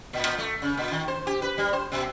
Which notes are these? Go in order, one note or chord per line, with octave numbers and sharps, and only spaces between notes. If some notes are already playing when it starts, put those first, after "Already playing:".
A#2
A#2
A3
C#3
A#2
D#3
C5
G4
B4
G3
C5
B2